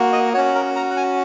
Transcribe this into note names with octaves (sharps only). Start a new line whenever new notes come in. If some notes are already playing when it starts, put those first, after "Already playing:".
Already playing: A#3 F#4
D#5
C#4 F#4 C#5
A#4
A#5
F#5
G#5